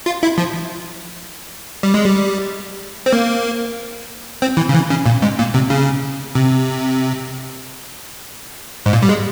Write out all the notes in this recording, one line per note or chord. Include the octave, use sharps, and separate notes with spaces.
F4
E4
F3
G3
G#3
G3
C4
A#3
C4
E3
C#3
E3
C#3
A#2
G#2
A#2
C3
C#3
C3
G#2
A#2
G3
G#3